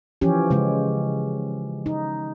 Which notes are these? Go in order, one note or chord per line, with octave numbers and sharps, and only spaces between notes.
E3 F3 C#4 G4
C#3 G#3 C#4
D#4